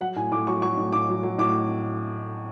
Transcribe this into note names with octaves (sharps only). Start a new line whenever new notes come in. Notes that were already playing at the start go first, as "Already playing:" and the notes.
F#3 F#5
A2 G#5
A2 D6
F#3 C#6
F#3 C#6
A2
A2 D6
F#3
F#3
A2 D6